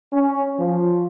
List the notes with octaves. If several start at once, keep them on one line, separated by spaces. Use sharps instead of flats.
C#4
F3